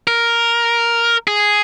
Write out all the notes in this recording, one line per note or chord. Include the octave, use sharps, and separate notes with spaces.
A#4
G#4